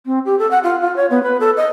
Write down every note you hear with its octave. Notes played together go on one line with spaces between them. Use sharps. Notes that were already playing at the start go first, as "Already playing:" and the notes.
C4
G4
A4
F#5
F4
F4
C#5
B3
B4
A4
D#5